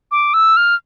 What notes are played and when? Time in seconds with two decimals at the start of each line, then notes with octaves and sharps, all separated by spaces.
0.11 D6
0.34 E6
0.57 F6